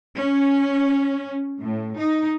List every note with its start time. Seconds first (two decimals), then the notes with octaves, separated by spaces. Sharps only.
0.19 C#4
1.62 A2
1.98 D#4